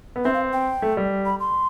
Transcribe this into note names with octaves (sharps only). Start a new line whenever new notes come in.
B3
C4 E5
F5
G5
A3
G3
B5
C6